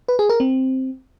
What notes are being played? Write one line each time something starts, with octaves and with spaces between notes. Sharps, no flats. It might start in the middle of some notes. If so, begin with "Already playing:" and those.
B4
G#4
A#4
C4